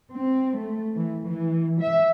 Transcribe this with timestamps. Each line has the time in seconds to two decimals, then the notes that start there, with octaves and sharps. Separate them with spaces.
0.15 C4
0.60 A3
0.95 E3
1.26 E3
1.80 E5